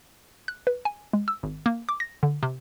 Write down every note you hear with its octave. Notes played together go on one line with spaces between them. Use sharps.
F#6
B4
G#5
G#3
E6
G#1
A#3
D6
A#6
D3
C3